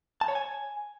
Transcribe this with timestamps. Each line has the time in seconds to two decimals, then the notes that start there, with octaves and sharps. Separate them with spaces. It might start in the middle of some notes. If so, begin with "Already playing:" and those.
0.21 A5
0.28 C#5
0.35 G#5